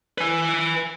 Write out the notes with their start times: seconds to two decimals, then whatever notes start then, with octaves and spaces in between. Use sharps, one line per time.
0.18 B4 G#5